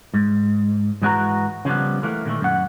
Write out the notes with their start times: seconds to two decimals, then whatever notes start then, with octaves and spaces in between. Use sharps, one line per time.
0.14 G#2
1.02 G#2 E3 C4 F#4 B4 A#5
1.65 C#3 F3 G3 B3
2.03 E3 A3 A#3
2.26 A#2 D#3 E3 A3
2.41 F#2 F#5